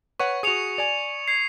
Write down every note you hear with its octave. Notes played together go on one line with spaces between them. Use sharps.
B4 C#5 F#5 C#6
F#4 G#4 D#6 C#7 F7
D5 G#5
G#6 C7